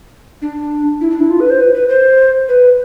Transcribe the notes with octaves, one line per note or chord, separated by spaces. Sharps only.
D4
E4
D4
E4
F4
B4
C5
B4
B4
C5
B4